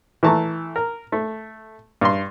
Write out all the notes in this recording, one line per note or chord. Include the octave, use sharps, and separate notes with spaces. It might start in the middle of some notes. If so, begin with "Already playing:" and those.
E3 A3 A5 A#5 C#6
A#4
A3
G2 C6